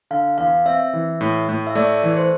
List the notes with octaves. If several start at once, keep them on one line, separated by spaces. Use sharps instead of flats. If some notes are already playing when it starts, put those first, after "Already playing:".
D3 F5
E2 F5
C4 E5
E3
A2
A2
E5
A3 D5
E3
C5